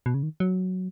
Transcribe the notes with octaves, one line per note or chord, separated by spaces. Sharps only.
B2
C#3
D#3
F#3